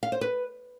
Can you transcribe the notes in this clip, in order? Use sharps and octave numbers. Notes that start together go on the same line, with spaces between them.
F5
C5
B4